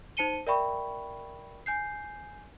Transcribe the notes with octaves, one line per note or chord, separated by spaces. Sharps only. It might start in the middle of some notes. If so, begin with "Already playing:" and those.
D#4 C5 A5 C#7 D#7 G7
A#4 D5 E5 G5 B5 C#6
G#5 G6 C7